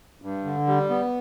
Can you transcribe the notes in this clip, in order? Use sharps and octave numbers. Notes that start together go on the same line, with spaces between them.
G2
D3
G3
B3